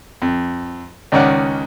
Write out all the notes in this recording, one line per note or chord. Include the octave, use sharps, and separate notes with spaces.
F2
C#2 D#3 C#4 D5 F#5